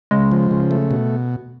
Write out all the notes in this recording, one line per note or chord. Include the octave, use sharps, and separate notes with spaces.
C#3 G#3
F3
C#3
A3
B2